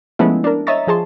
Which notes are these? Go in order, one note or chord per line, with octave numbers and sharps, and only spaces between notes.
F3 G#3 A3 B3 C#4 E4
D4 A#4
C#5 D#5 E5 A#5 C#6 A6
F3 G#4 A5 C6